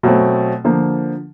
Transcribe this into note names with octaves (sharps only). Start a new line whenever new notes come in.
B2 F#3 A3 C4
D3 F3 A#3